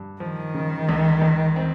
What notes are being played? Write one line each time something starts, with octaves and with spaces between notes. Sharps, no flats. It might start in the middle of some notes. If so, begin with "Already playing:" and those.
Already playing: G2
D#3 F3
C#3
C#2
C#2
C4